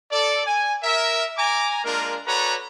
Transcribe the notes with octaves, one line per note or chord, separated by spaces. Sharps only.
A4 D5
G#5
A#4 E5
G#5 A#5 D6
G#3 A#3 D4 F4 A#4
F#4 A4 B4 C#5 D5 A#5